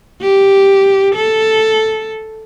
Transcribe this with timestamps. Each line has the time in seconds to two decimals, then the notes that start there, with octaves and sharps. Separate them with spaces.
0.22 G4
1.15 A4